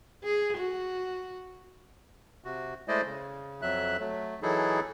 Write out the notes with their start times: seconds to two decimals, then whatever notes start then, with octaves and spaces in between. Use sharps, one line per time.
0.24 G#4
0.58 F#4
2.45 C3 F#4
2.88 G#3 A3 E4 C5 D5 D#5
3.05 C#3
3.62 F2 F#3 E5 F#6
4.00 F#3 A3
4.43 E3 F#3 D#4 E4 G#4 A4